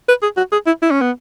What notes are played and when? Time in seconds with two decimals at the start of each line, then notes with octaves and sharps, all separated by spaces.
0.08 B4
0.23 G#4
0.37 F#4
0.52 G#4
0.67 E4
0.82 E4
0.91 C#4
1.01 B3